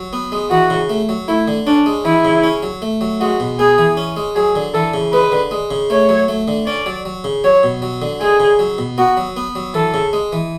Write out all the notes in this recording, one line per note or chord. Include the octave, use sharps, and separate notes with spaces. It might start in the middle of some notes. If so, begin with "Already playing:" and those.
Already playing: F#3
B3
G#3
E3 F#4
C#3
A3
F#3
A3 E4
D3
C#4 D4
G#3
E3 E4
C#3
C#4
F#3
A3
F#3
G#3 F#4
B2
B3 G#4
E3
C#4
G#3
F#3 G#4
D3
E3 A4
C#3
G#3 B4
D3
G#3
C#3
A3 C#5
F#3
A3
D3
C#4 D5
F#3
F#3
C#3
F#3 C#5
B2
F#3
D3
G#3 G#4
C#3
F#3
B2
B3 F#4
F#3
B3
F#3
E3 A4
C#3
G#3
E3